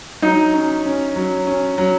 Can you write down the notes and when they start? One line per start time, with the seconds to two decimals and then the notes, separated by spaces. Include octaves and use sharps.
0.22 F#3 D#4
0.54 C#4
0.85 C#4
1.16 F#3
1.47 C#4
1.78 F#3